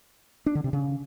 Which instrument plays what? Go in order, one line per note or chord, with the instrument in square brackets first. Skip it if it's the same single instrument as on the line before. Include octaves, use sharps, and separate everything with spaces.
[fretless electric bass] D4
D3
C3
C#3